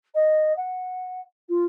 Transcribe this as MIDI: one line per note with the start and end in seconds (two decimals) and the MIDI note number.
0.14 0.55 75
0.57 1.21 78
1.49 1.64 65